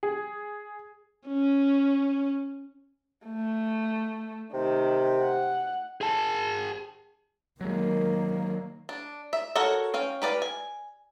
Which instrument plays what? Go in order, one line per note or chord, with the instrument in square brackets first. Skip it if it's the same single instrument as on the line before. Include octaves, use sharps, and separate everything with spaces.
[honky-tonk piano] G#4
[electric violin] C#4
[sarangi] A3
[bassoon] C3 [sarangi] D#3
[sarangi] F#5
[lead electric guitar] G#4 A5
[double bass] D#3 A#3 [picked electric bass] F#3 G#3
[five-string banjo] D4
E5
F#4 A4 A#4 C#5 F#5
C#4 F5 G5
G4 B4 D5 F5
G#5